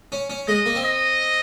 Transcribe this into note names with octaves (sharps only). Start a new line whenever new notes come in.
C#4
C#4
G#3 D#5
A#3
C4
D#5